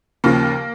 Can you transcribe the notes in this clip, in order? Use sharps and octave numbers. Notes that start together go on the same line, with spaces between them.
D#2 C#3 F3 A#3